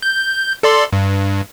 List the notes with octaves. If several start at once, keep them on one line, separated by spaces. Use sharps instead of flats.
G6
A4 D5 C6
G2